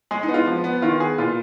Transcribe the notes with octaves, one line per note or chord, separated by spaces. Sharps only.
G#3 G#4
D#4
B3
F4
F3
B3
D#3 F4
B3 G#4
A#2 F4